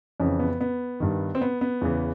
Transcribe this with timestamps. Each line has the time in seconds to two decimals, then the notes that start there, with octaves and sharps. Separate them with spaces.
0.20 F2 C#3 E3 C#4
0.40 B3
0.61 B3
1.00 G2 D#3
1.35 C4
1.41 B3
1.61 B3
1.81 E2 C#3 E3